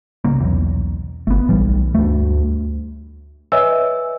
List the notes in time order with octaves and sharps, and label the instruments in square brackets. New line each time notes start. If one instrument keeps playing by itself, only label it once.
[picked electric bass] C2 C#3 A#3
B1 E2
[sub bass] G1 [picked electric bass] A3 B3
[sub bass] B1 [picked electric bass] A#2 E3 G3
[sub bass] D2 [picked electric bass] G2 A3
[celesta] B4 C#5 D#5 E5 G#5 E6